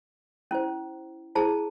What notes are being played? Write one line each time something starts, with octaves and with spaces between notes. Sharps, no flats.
C#4 E4 C5
E4 G#4 C5 A5